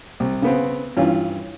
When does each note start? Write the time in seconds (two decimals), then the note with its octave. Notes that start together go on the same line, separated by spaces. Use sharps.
0.20 C2
0.42 C#3 B3 C4
0.97 G2 E3 C#4 F4